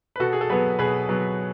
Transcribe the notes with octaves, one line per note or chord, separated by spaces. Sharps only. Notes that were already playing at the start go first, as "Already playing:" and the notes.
B4
B2 F#4 A4
G#4
A4
F#3 B3 G#4 B4
B2 G#4 B4
F#3 B3